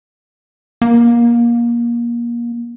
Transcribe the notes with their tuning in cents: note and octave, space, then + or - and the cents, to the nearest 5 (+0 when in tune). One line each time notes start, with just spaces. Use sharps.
A#3 +25